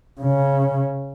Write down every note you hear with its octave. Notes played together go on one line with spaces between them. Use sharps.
C#3